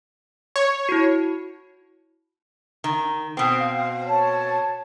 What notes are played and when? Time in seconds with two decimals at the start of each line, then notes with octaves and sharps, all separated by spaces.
0.56 C#5
0.89 E4 F#4
2.84 D#3
3.37 B2 C4 G5 D#6
3.57 F5
4.04 C#5 A5